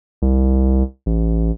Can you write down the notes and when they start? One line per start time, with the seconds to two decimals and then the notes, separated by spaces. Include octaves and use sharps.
0.22 C2
1.06 A1